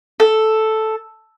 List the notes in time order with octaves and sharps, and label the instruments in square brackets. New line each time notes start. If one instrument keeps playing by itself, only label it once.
[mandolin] A4